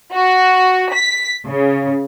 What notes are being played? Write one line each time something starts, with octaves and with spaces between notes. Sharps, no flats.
F#4
B6
C#3